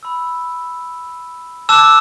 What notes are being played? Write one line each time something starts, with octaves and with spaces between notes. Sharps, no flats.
B5 E6
A5 D6 E6 F#6 E7